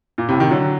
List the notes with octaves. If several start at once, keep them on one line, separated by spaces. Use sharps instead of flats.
A#2
A2 C3
C3 D#3
D3 F#3